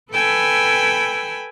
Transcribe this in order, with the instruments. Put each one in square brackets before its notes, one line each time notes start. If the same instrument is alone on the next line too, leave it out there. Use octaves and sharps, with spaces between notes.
[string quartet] A4 B4 G5 G#5 B5 E6